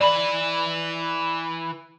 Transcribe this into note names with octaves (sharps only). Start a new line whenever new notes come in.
E3 B4 D5 B5